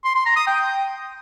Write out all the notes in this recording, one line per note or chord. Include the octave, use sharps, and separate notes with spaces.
C6
C6
A#5
D#6
G5